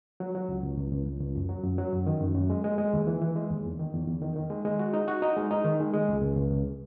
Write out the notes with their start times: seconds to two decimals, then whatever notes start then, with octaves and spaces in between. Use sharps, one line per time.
0.20 F#3
0.35 F#3
0.49 C#2
0.64 C#2
0.78 C#2
0.92 C#2
1.06 C#2
1.21 C#2
1.35 F#2
1.49 F#3
1.64 F#2
1.78 F#3
1.93 F#2
2.07 D#3
2.21 F#2
2.35 F#2
2.50 G#3
2.64 G#3
2.78 G#3
2.93 D#2
3.07 E3
3.21 E3
3.36 G#3
3.50 D#2
3.65 E2
3.79 D#3
3.93 E2
4.07 E2
4.22 D#3
4.36 D#3
4.50 G#3
4.65 G#3
4.79 F#4
4.94 D#4
5.08 F#4
5.22 D#4
5.36 G#3
5.51 D#4
5.65 D#3
5.80 G#3
5.94 G#3
6.09 C#2
6.22 C#2
6.36 C#2
6.51 C#2